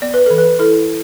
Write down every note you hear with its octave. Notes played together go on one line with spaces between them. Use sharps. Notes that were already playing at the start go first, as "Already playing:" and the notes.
B3 D5
B4
E3 A4
B4
E4 A4